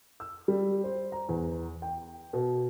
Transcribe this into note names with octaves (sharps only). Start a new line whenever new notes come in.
E6
G3
C5
A#5
E2
G5
B2